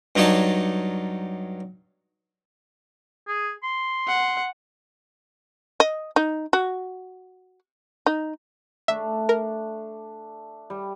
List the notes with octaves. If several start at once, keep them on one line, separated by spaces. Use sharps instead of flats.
G2 F#3 D#4 C#5 D5 A5
G#4
C6
F#5
D#5
D#4
F#4
D#4
A3 D4 E5
A#4
G3